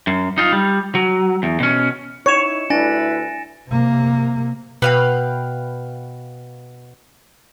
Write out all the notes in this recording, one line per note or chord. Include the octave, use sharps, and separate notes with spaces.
F#2
D#4 F4
G3
F#3
E2
B2 C#4
D#4 E4 C#5 C#7 E7
D2 D4 E4 B4 G#5 A6 A#6
C3 A#3
B2 B4 F5 G5